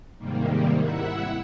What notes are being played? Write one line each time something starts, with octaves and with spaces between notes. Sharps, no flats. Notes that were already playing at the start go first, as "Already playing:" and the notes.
G#2 C3 D#3 G3 A#3
E4 E5 F#5